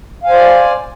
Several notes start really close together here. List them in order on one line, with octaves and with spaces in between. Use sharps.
F5 G#5 C5 D5